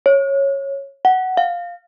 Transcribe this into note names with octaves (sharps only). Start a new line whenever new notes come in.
C#5
F#5
F5